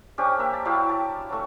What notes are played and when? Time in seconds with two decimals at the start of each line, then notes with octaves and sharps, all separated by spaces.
0.18 C#4 D4 G4 C5
0.37 A#3 A#4 E5
0.53 A5
0.65 F#3 E4 G4 F5
0.89 A5
1.30 F#3 A3